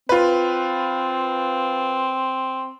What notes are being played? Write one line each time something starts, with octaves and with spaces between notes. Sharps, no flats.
C4 F4 B4